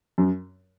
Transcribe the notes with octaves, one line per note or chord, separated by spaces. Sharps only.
F#2